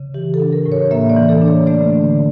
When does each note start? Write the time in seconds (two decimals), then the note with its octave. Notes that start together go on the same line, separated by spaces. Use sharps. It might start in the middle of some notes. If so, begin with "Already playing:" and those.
Already playing: C#3
0.14 E3 G4
0.34 A4
0.40 D4
0.53 A#4
0.66 A2
0.72 C#5
0.91 A#3 E5
1.10 D5
1.16 E3
1.29 A4
1.42 D4
1.48 C#5
1.67 A3 D5
1.93 D3